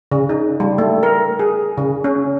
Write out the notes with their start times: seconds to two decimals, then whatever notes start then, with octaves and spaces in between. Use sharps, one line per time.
0.11 C#3
0.29 D#4
0.60 G3
0.78 A3
1.03 A#4
1.40 G#4
1.78 C#3
2.04 C#4